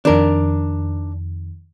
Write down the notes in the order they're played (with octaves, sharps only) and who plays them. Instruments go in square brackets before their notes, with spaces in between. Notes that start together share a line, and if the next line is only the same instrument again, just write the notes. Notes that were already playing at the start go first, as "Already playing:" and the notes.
[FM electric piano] F2 D#3 [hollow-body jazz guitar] D4 A#4